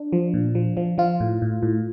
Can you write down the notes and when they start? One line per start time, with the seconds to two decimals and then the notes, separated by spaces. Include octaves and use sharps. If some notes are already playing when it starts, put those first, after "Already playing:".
Already playing: D4
0.12 F3
0.34 A#2
0.55 F3
0.77 F3
0.98 F3 F4
1.20 A2
1.42 A2
1.63 A2